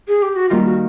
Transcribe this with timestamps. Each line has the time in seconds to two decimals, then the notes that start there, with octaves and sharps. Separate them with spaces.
0.08 G#4
0.22 G4
0.36 F#4
0.49 D#3 G3 A#3 F4
0.66 F#4